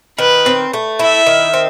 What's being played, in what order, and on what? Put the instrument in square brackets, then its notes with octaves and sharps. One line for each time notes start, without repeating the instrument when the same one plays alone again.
[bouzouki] D#3 [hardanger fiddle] B4
[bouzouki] C4
A3
[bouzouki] E4 [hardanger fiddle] E5
[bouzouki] D#3
C4